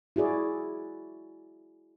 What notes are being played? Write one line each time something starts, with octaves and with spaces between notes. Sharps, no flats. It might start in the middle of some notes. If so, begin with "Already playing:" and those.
E4 F#4 G#4 D5